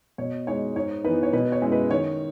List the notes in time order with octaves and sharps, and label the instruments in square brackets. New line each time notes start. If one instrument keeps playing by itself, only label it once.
[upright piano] B2 C#5
G#3 D#4 C#5
G#2 C#5
E3 B3 D#4 B4
C#5
B2 B4
C#5
G#3 C#4 E4
B4
D#3 C#5